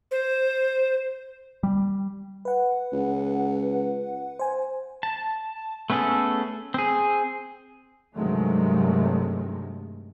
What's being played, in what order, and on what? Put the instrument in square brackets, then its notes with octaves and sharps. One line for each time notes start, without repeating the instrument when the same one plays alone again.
[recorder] C5
[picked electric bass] G3
[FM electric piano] B4 F#5
[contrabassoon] C#2
[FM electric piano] C5 G#5
[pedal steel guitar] A5
A3 B3 C#4 G#4 A4
C4 G#4
[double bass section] G2 C3 D#3 F#3 G#3 A3